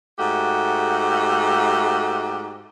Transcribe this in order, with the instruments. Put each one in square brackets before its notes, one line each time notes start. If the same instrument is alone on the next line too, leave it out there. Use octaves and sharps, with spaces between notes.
[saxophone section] G#2 A3 F#4 G4